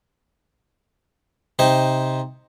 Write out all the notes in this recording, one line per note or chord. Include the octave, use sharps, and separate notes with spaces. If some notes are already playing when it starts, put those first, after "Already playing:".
C3 D#4 C5